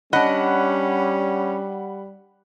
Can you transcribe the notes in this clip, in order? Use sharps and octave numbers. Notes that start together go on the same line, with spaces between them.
G3 C#4 D4 D#5 F#5 B5 F#6